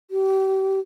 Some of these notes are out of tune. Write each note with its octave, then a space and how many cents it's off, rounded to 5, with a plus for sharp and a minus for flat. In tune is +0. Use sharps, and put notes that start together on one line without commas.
G4 -35